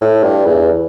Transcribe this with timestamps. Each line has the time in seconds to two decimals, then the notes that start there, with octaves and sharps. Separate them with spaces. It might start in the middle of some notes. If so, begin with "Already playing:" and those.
0.01 A2
0.23 G2
0.46 E2